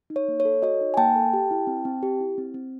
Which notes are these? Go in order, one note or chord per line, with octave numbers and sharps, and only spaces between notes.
D#4
C#5
A#3
C#5
A4
F#4 C#5 D#5
D#4
G#5
A#3 G5 A5
A4
G4
E4
C4
C4
G4
E4
C4
C4